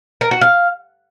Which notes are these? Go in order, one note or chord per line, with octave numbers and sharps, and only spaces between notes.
A#4
F#4
F5